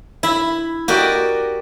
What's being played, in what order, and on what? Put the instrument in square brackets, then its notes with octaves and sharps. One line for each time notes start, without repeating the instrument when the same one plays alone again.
[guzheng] E4 B5
F#4 G4 A#4 D5 D#5